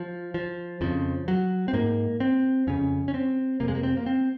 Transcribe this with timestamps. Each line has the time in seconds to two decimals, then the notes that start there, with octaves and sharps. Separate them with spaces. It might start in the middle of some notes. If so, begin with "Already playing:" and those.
Already playing: F3
0.34 F3
0.81 F2 C#3 F3
1.28 F#3
1.68 C4
1.73 G#2 A#3
2.20 C4
2.67 F2 C#3 C#4
3.08 C#4
3.14 C4
3.60 F2 C3 A#3
3.68 G#3
3.75 A#3
3.83 C4
3.97 A#3
4.06 C4